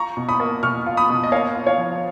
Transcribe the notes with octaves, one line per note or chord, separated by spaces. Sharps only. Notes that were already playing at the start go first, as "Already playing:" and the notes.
Already playing: F4 A#5 C#6
B2
B5 D#6
A#3
B2 C#6 F6
F4
B5 D#6
B2
D#5
A#3 C#5 F5
F4
C#5 F5
F3